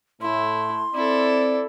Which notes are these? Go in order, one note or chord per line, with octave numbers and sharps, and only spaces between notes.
A2 A3 E4 C6
C4 E4 A4 D5